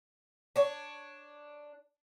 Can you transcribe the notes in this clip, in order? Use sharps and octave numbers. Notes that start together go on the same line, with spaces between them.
D4 C#5